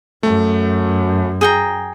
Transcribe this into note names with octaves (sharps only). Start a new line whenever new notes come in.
F#2 A3
G#4 G5 A#5